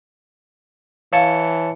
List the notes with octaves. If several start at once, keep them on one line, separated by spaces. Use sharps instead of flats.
E3 C#5 F5 A5 C#7